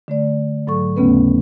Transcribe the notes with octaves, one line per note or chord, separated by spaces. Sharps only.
D3 A3 D5
G#2 F#3 A4 C#6
D#2 C#3 A3 B3 C#4 B4